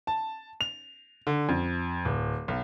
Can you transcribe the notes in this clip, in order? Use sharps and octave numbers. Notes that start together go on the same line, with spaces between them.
A5
F7
D3
F2
D1
B1